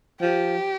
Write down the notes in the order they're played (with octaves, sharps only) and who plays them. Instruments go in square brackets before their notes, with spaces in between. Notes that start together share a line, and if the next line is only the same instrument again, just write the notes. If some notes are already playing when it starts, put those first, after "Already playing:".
[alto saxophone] F3 [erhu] G4